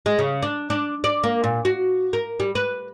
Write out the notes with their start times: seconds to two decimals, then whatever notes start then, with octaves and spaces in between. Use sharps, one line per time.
0.06 G#3
0.19 C#3
0.43 D4
0.70 D4
1.04 D5
1.24 A#3
1.44 A#2
1.65 F#4
2.13 A#4
2.40 G3
2.55 B4